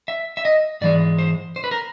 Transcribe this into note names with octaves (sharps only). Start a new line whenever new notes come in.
E5
E5
D#5
G#2 E3 G#3 D5
C5
C5
B4
A#4